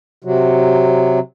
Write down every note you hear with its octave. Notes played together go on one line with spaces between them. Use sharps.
C3 F#3